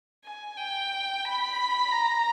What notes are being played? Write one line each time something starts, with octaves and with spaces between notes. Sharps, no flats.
G#5
G5
B5
A#5